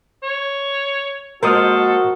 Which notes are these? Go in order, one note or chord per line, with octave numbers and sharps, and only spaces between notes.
C#5
F3 G#3 A#3 F#4 A4 A#4 D#6 F6